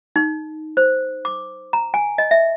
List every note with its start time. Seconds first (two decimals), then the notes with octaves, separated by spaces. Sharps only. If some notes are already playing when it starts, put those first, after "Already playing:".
0.16 D#4
0.77 C5
1.25 D6
1.73 A#5
1.94 G#5
2.18 D#5
2.31 E5